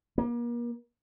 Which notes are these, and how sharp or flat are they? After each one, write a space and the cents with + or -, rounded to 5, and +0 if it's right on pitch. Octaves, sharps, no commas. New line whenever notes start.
A#3 +40